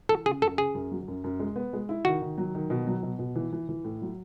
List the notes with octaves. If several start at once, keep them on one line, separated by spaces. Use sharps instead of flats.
E3 A4
C#3 G#4
F#2 A4
C#3 G#4
F#2
F#3
F#2
F#2
G#3
B3
G#3
E4
D#3 F#4
D#3
F#3
D#3
B2
F#3
B2
B2
E3
E3
E3
A2
F#3